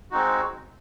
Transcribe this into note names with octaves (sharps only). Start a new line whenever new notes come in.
G#3 C4 D#4 F#4